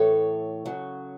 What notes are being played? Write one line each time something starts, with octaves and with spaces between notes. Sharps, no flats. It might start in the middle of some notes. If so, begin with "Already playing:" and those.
Already playing: A2 E3 A4 C#5
C#3 F#3